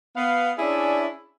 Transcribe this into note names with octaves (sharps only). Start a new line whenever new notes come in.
B3 F5
C#4 D4 E4 G#4 D5 E5